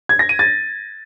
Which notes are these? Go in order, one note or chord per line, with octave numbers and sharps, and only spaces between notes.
G#6
A#6
D#7
A6